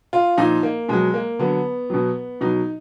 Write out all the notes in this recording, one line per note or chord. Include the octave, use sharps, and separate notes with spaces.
F4
A#2 F3 D#4
A#3
B2 F#3 G#3
A#3
D3 F#3 B3
B2 F#3
B2 F#3 D#4